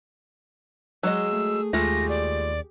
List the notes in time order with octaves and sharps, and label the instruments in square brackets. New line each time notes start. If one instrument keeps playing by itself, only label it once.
[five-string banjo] F#3 G#3 D#5 [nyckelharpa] G#4 [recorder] E6
[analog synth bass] A3
[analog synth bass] D#2 [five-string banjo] G#3 A3 F4 [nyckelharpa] G4 G#4 [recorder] A#6
[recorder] D5